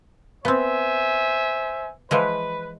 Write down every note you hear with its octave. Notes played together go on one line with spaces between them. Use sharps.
B3 C4 C5 E5 G#5
E3 F3 G#3 B4